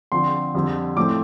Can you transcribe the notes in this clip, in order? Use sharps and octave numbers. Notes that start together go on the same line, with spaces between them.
D3 F3 C4 C6
F2 D3 G3 C4
A2 F3 A3 C4 D6